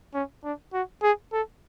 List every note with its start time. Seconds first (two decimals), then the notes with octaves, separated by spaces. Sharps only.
0.14 C#4
0.44 D4
0.73 F#4
1.02 G#4
1.33 A4